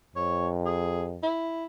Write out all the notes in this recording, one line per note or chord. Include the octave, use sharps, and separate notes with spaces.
F2 C#5
G#4
E4